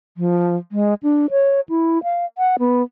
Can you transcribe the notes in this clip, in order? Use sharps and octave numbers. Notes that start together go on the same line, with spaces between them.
F3
G#3
D4
C#5
E4
F5
F#5
B3